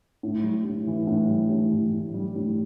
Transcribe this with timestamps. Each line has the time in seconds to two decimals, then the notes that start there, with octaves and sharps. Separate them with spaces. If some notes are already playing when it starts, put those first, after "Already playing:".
0.23 A2
0.43 G3
0.65 A2
0.87 E3
1.07 A2
1.28 G3
1.50 A2
1.71 E3
1.92 A2
2.14 G3
2.35 A2